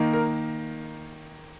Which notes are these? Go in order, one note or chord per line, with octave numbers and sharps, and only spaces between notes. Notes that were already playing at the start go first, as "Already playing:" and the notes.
Already playing: D#3 A#3 D#4
A#4